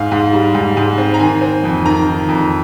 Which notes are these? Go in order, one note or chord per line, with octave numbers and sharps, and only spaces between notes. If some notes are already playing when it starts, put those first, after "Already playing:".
Already playing: G#2 F5
G#2
G3
G#2
G#2
C4
A#5
D#3 G#5
C4
F2
D#3 A#5
D#3
F2